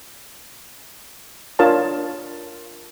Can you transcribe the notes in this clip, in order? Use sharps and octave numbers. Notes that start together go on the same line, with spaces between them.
D4 F4 A#4 C#5 A5